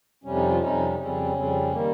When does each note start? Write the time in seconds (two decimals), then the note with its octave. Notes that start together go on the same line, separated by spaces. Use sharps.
0.24 F2 C3 G3 C#4
0.36 D#4
0.48 F3 F4
0.60 F2 C3 G3 C#4 D#4
0.98 F2 C#3 G3 C4 C#4
1.34 F2 C#3 G3 C4
1.72 D#3 G3 A#3